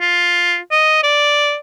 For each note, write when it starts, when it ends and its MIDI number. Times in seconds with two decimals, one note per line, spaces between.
0.01 0.58 65
0.71 1.02 75
1.03 1.56 74